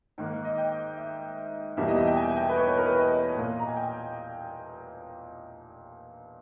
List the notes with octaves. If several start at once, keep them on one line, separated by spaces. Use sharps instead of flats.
G#2 D#3 A#3
D#5
G5
E5
E2 B2 G3 A#3 E5
D#5
E5
G5
G#5
G5
B4
C#5
B4
A#4
B4
D#5
A#2 A#3
A#5
G#5
G5